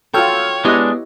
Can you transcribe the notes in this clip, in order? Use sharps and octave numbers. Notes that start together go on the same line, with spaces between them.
F4 F#4 A4 C#5 G5 E6 F6
G#3 B3 D4 E4 G4 D#5